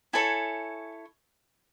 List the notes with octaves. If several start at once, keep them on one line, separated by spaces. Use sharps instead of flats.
E4 A4 C#5 G#5